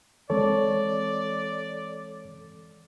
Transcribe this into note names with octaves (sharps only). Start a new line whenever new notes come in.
E3 G#3 C4 A4 C#5 D5